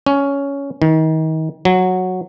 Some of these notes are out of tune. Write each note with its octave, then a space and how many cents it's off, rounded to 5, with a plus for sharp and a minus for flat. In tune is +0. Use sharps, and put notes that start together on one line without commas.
C#4 +10
D#3 +35
F#3 -10